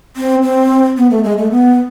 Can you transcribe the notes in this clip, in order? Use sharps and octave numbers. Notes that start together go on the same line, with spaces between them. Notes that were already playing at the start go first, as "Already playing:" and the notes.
C4
C4
B3
A3
G#3
A3
B3